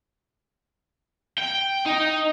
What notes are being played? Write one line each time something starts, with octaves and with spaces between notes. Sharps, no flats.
G5
D#4